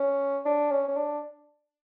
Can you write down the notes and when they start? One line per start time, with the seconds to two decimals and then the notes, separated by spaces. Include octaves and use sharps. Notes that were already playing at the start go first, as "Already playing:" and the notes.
Already playing: C#4
0.45 D4
0.71 C#4
0.88 C#4
0.96 D4